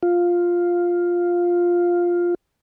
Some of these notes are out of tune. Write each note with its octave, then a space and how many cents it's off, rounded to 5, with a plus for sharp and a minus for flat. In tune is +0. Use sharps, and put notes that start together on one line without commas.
F4 +5